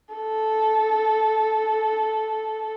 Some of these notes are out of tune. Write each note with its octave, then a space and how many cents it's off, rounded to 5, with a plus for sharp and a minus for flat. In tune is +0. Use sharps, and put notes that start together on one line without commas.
A4 -10